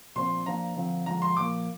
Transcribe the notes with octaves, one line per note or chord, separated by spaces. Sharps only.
A#2 F3 C4 C6
F3 A#3 D4 A#5
D3 F3 C4
D3 F3 G#3 A#5
C6
A#2 F3 A#3 D6